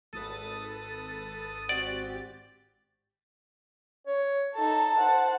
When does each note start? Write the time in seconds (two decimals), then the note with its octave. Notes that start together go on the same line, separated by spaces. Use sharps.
0.13 G#1 A4 B4 D#6 A6
1.69 C4 F#4 G4 D5
4.07 C#5
4.54 D#4 A4 A5
4.98 C5 F#5